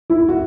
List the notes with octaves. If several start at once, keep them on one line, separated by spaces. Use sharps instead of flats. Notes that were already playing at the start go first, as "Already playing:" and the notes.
E4
F#4